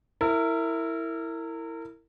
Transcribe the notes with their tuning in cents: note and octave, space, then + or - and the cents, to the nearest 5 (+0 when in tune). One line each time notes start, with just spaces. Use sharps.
E4 +0 A#4 -30